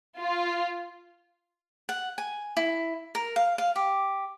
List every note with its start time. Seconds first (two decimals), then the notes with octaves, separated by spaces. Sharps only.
0.20 F4
1.89 F#5
2.18 G#5
2.57 E4
3.15 A#4
3.36 F5
3.58 F5
3.76 G4